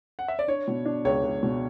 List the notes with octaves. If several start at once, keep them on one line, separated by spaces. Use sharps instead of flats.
F#5
E5
D5
D4 C#5
B2
D4
C#2 C#5
C#2
B2